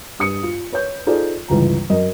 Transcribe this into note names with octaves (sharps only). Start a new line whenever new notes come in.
G2 D#6 C#7
F4
B4 C#5 G6
D#4 F4 G#4 A4 C5 D5
G1 C#2 E3 A#5
F#2 A#4 D#5